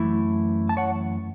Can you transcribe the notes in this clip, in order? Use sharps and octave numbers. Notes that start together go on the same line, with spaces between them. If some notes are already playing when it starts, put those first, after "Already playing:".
Already playing: F#2 E3 A3 E4
A5
C#5 F#5